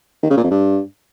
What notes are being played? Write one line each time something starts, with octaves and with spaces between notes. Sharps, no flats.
D#3
C#3
A#2
F2
G2